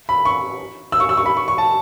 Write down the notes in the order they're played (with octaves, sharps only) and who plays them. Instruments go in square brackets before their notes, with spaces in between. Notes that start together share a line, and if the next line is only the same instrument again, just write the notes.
[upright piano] B5
C#6
E6
C#6
E6
C#6
B5
C#6
C#6
A5